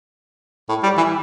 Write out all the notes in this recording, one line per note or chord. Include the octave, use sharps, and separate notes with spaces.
A2
G3
E3